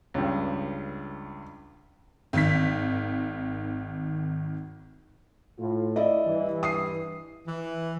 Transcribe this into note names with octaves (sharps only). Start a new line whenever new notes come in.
C#2 G2
G#1 D#3 B6
A2 F4
E4 D5 D#5
G2 E3
D#6 C7
E3